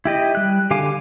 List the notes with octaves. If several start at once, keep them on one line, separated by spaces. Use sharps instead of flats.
E4 G4 D#5
G3 F#6
D3 G4 F5 G#5 D6